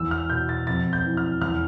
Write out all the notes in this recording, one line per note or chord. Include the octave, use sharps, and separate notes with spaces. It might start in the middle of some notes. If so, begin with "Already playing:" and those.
Already playing: E2 E6
F6
B2 G6
A6
F2 A6
G6
E3
F6
E2 F6